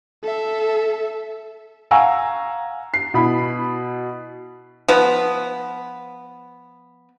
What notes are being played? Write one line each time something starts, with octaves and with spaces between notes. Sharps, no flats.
A4 E5
F5 F#5 G#5 A#5 C#6 E6
C7
B2 E4 B5
F3 B3